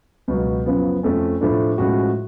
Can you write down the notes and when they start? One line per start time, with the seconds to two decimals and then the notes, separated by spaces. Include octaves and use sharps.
0.28 C#2 B2 F#3
0.66 F#2 C#3 F3 B3
1.03 F2 F3 A3 C#4
1.41 A2 F3 A3 D4
1.78 A2 F3 G#3 C#4 F#4